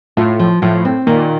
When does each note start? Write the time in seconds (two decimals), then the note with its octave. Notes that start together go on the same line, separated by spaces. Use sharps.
0.17 A2 F4
0.39 F3
0.62 A2 F3
0.85 C4
1.07 A#2 D#3